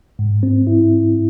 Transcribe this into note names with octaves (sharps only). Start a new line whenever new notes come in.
G#2
C4
E4